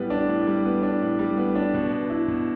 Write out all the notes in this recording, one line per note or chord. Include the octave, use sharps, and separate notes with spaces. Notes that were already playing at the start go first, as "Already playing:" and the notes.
Already playing: A2 G3 B3
D4
A2
G3
B3
D4
A2
G3
B3
D4
B2
B3
E4
B2